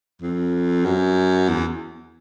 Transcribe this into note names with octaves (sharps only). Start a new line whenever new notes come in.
F2
F#2
E2